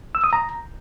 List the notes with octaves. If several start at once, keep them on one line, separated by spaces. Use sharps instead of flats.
E6
D#6
A#5